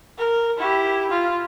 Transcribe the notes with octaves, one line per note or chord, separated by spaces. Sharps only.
A#4
E4 G4
F4